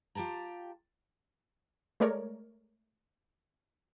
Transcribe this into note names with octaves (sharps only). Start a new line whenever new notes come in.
F4 G4 G5 A5 A#5
G#3 A3 A#4 C#5 D5